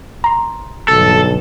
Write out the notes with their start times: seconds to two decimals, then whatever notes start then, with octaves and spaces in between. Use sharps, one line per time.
0.24 A#5 C6
0.88 B1 G2 D3 A4